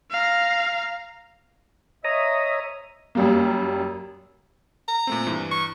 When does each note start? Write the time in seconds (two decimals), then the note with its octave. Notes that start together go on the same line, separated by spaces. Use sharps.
0.11 F5 A#5
2.05 C#5 D#5 E5 A#5 D#6
3.15 F#2 G3 A#3
4.88 A#5
5.07 A#2 A3 C4
5.27 G2 E3
5.51 C#6